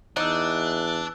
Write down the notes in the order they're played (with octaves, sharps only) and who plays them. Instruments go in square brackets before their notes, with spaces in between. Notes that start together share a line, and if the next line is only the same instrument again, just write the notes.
[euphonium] E2 [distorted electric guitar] D4 [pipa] D#4 [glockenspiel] E6 F#6